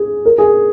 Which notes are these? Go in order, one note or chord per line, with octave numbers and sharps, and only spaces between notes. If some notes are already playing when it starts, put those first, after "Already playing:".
Already playing: G#4
A#4
G#4